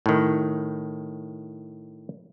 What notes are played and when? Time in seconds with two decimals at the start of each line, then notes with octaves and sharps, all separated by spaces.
0.06 A2 D#3